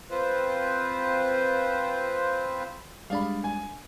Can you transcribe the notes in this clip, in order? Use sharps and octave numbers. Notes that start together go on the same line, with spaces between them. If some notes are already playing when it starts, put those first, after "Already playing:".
C4 F4 B4 C5
G3 G#3 D4 F5 B5
G#5